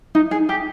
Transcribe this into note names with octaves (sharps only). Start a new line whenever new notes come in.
D#4
G#4
G4